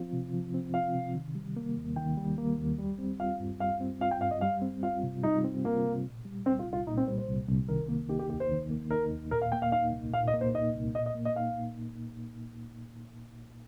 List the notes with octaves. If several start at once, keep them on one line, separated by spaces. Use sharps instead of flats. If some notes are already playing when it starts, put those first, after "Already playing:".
Already playing: F3 C4 F4
C3
F3
C4
F4 F5
C3
D#3
G3
A#3
D#2
D#3 G5
G3
A#3
D#2
G3
C4
F4 F5
G2
G3 F5
C4
F4 F5
G5
G2 F5
D#5
G3 F5
C4
F4 F5
C3
G3 D#4
C4
A#3 F4
C3
A#2
G3
C2 C4
F4
C2
F4
A#2 D#4
C4
G3 C5
C5
C2
C2
D#3 A#4
A#3
D#4 G4
G4
D#2 G4
C5
D#3
A#3
D#4 A#4
D#2
A#2 A#4
F5
A#3 G5
F5
D#4 F5
C2
A#2 F5
D#5
A#3
C5
D#4 D#5
C2
A#2 D#5
D#5
A#3
D#5
D#4 F5